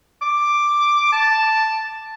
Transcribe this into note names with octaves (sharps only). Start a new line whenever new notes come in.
D6
A5